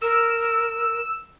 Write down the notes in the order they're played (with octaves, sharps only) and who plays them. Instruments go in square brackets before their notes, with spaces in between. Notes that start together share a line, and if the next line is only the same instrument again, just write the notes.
[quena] A#4 [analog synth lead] E6